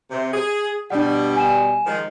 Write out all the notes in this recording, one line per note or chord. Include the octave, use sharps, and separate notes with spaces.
C3
G#4
B2 G3 D4 F#5
G#5 E7
D#3 F3 G#3